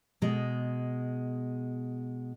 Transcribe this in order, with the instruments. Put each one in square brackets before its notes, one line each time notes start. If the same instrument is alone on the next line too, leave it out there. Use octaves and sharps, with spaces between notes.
[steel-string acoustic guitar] B2 G#3